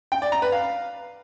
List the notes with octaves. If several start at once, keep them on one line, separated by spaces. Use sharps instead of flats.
G5
D5
A#5
B4
F5